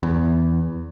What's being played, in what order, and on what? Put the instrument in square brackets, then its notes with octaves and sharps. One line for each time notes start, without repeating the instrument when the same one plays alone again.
[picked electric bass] E2